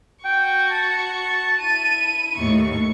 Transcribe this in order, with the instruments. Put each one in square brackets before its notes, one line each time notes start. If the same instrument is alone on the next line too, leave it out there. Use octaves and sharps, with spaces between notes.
[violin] F#4 C#6 [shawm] G5
[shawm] A5
[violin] E4 D#7
[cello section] D#2 A2 A3 [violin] C#6